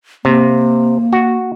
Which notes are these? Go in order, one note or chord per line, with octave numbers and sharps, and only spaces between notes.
C3 A#3
F#4